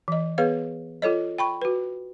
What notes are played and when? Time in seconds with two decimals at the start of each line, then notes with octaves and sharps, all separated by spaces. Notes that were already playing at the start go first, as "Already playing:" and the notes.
0.08 E3 D#5
0.38 B3 G#4 B4 C#5 F5
1.02 F4 A4 C#5 D#5
1.38 G5 B5 C#6
1.62 F#4 B4